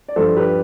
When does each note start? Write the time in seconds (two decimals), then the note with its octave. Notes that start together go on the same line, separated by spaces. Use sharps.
0.08 D5
0.16 G2 F3 A4 C5
0.37 G4 B4